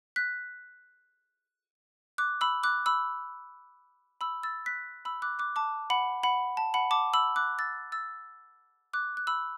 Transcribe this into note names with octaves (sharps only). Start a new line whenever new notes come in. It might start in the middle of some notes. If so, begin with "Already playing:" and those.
F#6 B6
D6 F#6
B5 E6
D6 F#6
B5 E6
B5 E6
E6 A6
F#6 B6
B5 E6
D6 F#6
D6 F#6
A5 D6
F#5 B5
F#5 B5
A5
F#5 B5
A5 D6
B5 E6
D6 F#6
E6 A6
E6 A6
D6 F#6
F#6
B5 E6